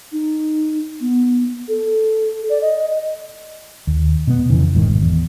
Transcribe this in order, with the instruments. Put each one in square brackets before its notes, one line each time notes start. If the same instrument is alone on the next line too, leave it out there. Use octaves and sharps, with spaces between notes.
[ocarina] D#4
B3
A4
D5
D#5
[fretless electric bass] D#2
B2 B3
F2 C#3 E3
E1 A1 G#2 D#3
G#1
E2